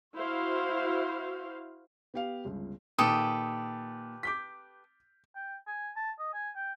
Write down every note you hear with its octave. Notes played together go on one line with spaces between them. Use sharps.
E4 F#4 C5 F5
B3 G4 F5
G1 C#2
A#2 D#3 G4 A4 B4 D#6
D6 G6 B6
G5
G#5
A5
D#5
G#5
G5